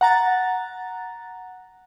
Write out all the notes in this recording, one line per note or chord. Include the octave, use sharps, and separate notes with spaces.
F#5 A#5 A6